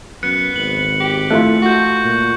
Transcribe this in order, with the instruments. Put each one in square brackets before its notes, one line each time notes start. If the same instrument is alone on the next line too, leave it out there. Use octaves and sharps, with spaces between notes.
[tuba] F#2 [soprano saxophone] B3 [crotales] F#6 C#7
[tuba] G#1 [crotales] F#7
[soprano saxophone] G4
[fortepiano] A3 E4 F4 [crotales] F#6
[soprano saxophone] F#4 [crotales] C#6 G6
[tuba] A#2